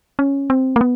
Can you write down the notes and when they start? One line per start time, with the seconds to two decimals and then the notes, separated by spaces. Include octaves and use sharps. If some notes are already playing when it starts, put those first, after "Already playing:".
0.19 C#4
0.50 C4
0.76 A#3
0.81 B3